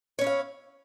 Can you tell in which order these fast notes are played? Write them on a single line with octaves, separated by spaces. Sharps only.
C#5 C#4 E4 F5